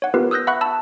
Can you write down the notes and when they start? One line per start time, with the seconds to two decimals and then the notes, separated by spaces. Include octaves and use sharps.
0.02 C#5 F#5
0.14 B3 F4 G4 A#4 B4
0.31 D#6 E6 F#6 G6 A#6
0.47 E5 F#5 B5 C#6 F#6
0.61 A5 B5 E6